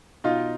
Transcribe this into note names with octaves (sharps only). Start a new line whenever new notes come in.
B2 D#4 F4